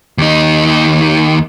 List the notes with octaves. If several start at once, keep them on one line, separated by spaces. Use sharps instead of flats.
D#2 D#4